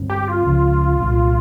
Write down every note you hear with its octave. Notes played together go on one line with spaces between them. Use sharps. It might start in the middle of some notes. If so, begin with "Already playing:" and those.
Already playing: G2 D3 G3 C4
G4
F4
C#2 C#3 F3
C2 A#2 G3